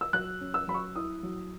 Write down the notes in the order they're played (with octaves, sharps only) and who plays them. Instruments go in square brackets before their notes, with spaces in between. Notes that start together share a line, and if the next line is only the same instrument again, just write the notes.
[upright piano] E6
F#3 F#6
C#4
E6
F#3 B5
C#6
E4 D#6
F#3